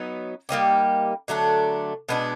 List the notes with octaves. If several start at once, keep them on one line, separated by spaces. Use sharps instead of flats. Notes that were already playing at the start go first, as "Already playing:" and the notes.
Already playing: F#3 B3 D#4
G3 A#3 D#4 G4
D3 F#3 A3 D4
B2 G#3 B3 D4